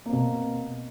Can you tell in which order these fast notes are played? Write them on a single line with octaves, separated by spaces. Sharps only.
A#3 C4 B2